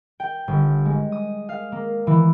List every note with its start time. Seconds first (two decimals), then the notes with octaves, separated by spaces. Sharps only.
0.20 G5
0.48 G1
0.86 G#3
1.12 D#6
1.49 F5
1.72 A#3
2.07 E3